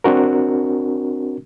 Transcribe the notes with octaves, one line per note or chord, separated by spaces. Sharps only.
C4 D4 F#4 A#4